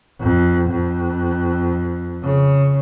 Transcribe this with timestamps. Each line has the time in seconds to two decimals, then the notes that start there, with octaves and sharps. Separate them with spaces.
0.21 F2
0.71 F2
2.24 C#3